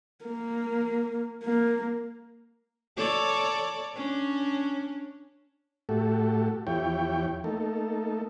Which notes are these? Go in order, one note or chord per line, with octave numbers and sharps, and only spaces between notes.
A#3
A#3
A4 C#5 D5
C#4 D4
A2 A3 F#4 G4 A4
E2 F3 E4 G4 C#5 G5
A3 A#3 D#4 A4